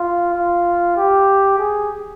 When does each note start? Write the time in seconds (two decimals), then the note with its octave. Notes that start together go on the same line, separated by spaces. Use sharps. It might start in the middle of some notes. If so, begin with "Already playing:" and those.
Already playing: F4
0.34 F4
0.97 G4
1.59 G#4